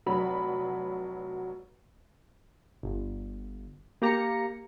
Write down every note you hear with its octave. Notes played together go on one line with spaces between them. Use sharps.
F1 F#3 B5
G1
A#3 G4 A#5 A#6 C#7